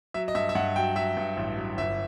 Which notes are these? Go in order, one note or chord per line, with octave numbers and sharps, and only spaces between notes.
F#3 E5
D#5
G2 E5
E5
G2 F#5
F#3 G5
F#3 E5
G2
A1
F#3
G1 E5